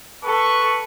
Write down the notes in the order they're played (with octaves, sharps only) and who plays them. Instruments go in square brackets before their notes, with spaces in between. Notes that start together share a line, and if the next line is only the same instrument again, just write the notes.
[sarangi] A4 [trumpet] B4 [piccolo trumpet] C#6